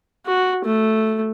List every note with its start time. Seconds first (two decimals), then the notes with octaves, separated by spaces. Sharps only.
0.26 F#4
0.65 A3